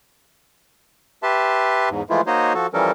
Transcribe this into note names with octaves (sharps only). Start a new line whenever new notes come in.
G4 B4 E5 A5 C6
E2 G#2
E3 F3 G#3 A3 E4 F4
A#3 D#4 F#4 C5 C#5 D#5
F3 F#4 A4
E3 F3 G3 C#4 A4 A#4